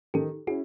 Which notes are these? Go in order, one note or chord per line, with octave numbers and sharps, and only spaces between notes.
D#3 G4 A4
C#4 E4 F#4 G#4